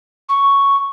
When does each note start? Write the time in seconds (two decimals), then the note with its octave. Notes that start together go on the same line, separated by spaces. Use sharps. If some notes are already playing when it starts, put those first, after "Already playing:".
0.29 C#6